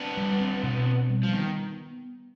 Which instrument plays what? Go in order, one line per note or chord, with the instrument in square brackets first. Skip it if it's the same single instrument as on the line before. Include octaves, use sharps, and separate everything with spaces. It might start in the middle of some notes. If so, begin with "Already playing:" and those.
Already playing: [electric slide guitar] B3 D4 [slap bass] C4
[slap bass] G3
C4
B2
C4
G3
[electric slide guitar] F3
[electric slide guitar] D#3 [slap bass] B3